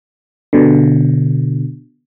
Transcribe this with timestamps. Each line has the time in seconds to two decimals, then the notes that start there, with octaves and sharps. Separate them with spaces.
0.53 B2 D3